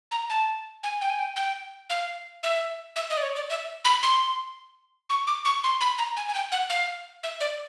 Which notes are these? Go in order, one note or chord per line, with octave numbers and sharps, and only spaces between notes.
A#5
A5
G#5
G5
G#5
G5
G5
F5
E5
E5
D#5
D5
C#5
D5
E5
B5
C6
C#6
D6
C#6
C6
B5
A#5
G#5
G#5
G5
F#5
F5
E5
D5